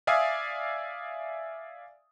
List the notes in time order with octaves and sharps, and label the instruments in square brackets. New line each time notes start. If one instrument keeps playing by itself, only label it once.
[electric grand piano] D5 E5 F5 G#5 D#6